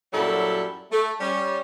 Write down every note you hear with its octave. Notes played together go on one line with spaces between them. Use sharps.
F#2 A#2 F#3 G3 E4 A4
A3
G3 C#4